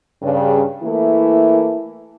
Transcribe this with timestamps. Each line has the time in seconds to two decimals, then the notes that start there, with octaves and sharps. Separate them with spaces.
0.22 G2 C#3
0.82 E3 A3 A#3 E4